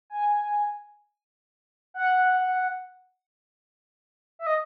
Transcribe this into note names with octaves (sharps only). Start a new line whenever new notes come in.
G#5
F#5
E5
D#5